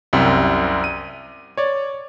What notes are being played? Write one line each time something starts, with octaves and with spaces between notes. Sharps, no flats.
C2 F#2 C3
D#7
C#5 D5